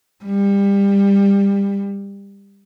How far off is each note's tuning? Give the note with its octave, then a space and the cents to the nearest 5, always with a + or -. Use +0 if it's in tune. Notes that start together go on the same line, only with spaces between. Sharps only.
G3 +25